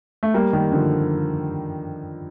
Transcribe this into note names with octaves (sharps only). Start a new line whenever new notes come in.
A3
G3 A#3
D#3 G3
D3 F3